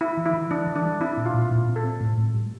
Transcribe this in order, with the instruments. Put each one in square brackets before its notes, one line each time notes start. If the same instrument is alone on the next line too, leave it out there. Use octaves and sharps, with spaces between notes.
[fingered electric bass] D4 [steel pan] E4
[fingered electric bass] E3
[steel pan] E4
[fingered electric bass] E3
[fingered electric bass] E3 [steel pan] D4
[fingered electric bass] E3
[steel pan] D4
[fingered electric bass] G3
[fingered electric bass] C4 [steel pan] E4
[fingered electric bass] A#2
[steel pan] F4
[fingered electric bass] A#2
A#2
C4
[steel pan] A4
[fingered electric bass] C4
A2
A2
G3